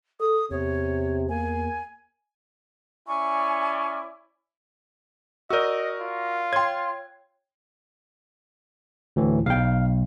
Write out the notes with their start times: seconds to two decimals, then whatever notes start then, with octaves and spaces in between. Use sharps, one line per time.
0.20 A4 D#6
0.51 E2 C3 C#5
1.29 A#3 G#5
3.08 C#4 E4 D5 G#5 C#6
5.50 F#4 A#4 D5 D#5 E6
6.01 F4
6.53 C#5 G5 C6 G#6
9.16 D2 A2 E3
9.46 B1 F5 G5